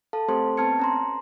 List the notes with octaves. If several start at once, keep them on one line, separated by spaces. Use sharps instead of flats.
A4 F5 A5
A3 C4 G4 A4 C5 C6
B3 C4 A5 F6 G#6 C#7
C#4 A#5 C6